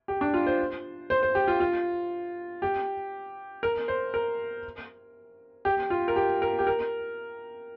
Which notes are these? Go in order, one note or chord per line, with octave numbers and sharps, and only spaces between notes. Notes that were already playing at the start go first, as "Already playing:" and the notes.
G4
D4
F4
C5
C5
C5
G4
F4
F4
G4
A#4
C5
A#4
G4
F4
A#4
G4
A#4
G4
A#4